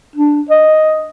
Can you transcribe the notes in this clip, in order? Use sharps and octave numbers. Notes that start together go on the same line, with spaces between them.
D4
D#5